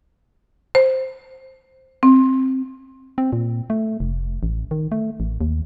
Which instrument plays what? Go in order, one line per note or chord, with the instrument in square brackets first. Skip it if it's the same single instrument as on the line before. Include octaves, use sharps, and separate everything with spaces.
[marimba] C5
C4
[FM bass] C4
A#2
A3
F1
A1
D#3
A3
A1
D#2